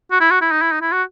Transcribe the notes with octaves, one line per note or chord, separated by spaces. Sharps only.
F#4
E4
F#4
E4
D#4
E4
D#4
E4
F#4